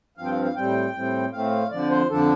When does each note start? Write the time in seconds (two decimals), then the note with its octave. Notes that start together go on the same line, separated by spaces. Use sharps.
0.17 G2 F3 C4 F5
0.25 G5
0.30 F5
0.43 F5
0.55 A2 G3 C4 G5
0.94 A2 G3 C4
1.33 A2 A3 C4 F5
1.71 F2 D3 F3 D5
1.90 C5
2.10 F2 D3 F3 D4 A4